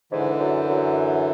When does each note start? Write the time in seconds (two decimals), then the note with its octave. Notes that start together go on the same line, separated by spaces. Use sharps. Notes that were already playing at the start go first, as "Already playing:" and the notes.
0.12 G#2 D3 E3
0.40 F#2
0.69 F#2